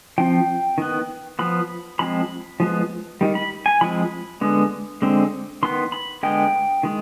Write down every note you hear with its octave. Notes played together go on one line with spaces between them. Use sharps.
F3 C4 G5
D#3 B3
F3 B3 B5
F3 G#3 C4 B5
F3 G#3 B3
D#3 G3
B5
G#5
F3 G#3 C4 B5
D3 G#3 B3
D3 G#3 C4
D#3 B3 C6
B5
D3 G#3 B3 G5
D#3 G#3